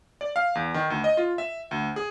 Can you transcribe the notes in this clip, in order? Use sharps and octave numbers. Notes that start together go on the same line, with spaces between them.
D5
F5
E2
D#3
D2
D#5
F4
E5
D2
G#4